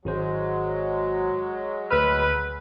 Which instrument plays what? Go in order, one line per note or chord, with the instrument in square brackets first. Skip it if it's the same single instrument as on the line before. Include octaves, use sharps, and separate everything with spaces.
[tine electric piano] G#1 F#4 C5 [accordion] F#3 G#3
[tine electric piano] D2 E6 F6 [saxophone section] B4